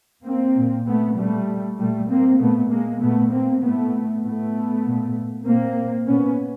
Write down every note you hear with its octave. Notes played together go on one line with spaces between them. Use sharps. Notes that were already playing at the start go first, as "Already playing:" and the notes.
A#3 C4
A#2
A3 B3
A#2 G3 A3
A#2 G3 A3
A#3 C4
A#2 A3 B3
G#3 A#3
A#2 A3 B3
A#3 C4
A2 A3 B3
A2 A3 B3
A#2
A#2 A#3 C4
A#2 B3 C#4